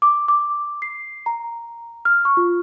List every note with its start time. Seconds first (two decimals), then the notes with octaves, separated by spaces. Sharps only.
0.02 D6
0.28 D6
0.82 C7
1.26 A#5
2.05 F6
2.25 C#6
2.37 F4